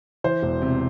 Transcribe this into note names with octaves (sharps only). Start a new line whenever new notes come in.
E3 C5
E1
C3